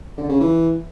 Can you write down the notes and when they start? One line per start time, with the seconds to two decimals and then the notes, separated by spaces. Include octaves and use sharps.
0.17 D3
0.29 C#3
0.40 E3